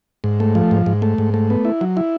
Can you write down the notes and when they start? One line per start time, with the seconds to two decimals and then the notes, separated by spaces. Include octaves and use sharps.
0.24 G#2
0.40 A3
0.55 F3
0.71 G#2
0.86 G#2
1.02 A3
1.18 G#2
1.34 A3
1.50 B3
1.65 E4
1.81 F#3
1.97 E4